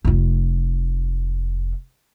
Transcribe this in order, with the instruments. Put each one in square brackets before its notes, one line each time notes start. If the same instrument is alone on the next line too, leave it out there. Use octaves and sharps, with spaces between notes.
[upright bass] F1 F4